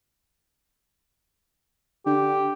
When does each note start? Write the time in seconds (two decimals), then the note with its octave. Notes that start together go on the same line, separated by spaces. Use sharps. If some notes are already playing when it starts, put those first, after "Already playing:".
2.06 D3 G4